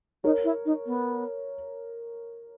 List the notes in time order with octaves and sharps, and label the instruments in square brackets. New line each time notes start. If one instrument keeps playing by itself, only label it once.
[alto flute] D#4 [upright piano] A#4 C#5
[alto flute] E4
D#4
B3